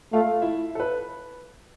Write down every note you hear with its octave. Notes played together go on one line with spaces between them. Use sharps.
A3 F4 F5
E4 E5
A4
B4